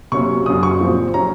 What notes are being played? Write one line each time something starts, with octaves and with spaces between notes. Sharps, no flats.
C3 F#3 A#3 C#4 C#6
F#2 C#3 F#3 C#4 D#6
C#6
A#2 F3 C4
F#3 C#4 A#5